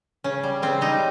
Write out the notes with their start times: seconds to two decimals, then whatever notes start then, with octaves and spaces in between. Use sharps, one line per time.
0.24 C#3 C#4
0.43 G3
0.62 C#3 C4
0.81 G3 D#4